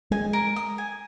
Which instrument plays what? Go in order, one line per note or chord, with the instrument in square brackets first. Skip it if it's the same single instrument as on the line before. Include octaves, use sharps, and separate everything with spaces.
[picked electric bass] G#3 [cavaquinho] G#5
[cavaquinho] A#4
D#6
G#5